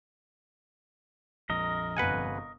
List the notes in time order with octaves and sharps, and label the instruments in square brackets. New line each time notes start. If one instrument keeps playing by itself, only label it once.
[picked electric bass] A#1 F2 [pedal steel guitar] A#4 D#5
[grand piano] G1 C3 [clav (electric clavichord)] B4 F#5 G#5